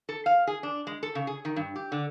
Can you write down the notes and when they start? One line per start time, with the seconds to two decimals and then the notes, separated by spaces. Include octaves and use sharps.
0.09 A4
0.26 F5
0.47 G#4
0.63 D4
0.87 G#3
1.03 A4
1.15 C#3
1.27 G#4
1.45 D#3
1.56 G2
1.76 G4
1.92 D3